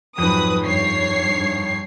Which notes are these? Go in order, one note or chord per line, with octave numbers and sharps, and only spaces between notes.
F2 G#2 F#3 B4 D#6
G2 C#5 C7